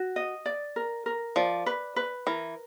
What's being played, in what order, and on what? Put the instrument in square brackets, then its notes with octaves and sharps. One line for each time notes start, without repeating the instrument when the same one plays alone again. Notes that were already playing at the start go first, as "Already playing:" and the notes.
Already playing: [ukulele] F#4
D#5
D5
A#4
A#4
[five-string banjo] F3 [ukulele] D5
[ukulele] B4
B4
[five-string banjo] E3 [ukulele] A#4